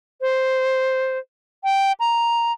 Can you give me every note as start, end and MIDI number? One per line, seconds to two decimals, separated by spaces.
0.21 1.18 72
1.64 1.92 79
2.00 2.52 82